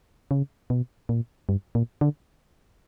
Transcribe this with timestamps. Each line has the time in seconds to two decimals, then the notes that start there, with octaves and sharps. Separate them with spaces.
0.31 C#3
0.70 B2
1.09 A#2
1.49 G2
1.75 A#2
2.01 D3